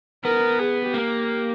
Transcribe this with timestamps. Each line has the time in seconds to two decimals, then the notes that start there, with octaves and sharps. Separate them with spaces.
0.25 B3 A#4
0.59 G#4
0.94 A#3 G4